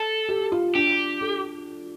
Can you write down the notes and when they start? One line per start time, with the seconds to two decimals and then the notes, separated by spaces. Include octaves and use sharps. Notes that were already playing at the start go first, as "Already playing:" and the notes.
Already playing: A4
0.29 G4
0.52 F4
0.75 D4 G4
1.21 A4